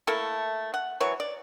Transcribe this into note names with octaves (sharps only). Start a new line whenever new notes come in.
A3 A#3 E4 A4
F#5
E3 F#3 C#5
D5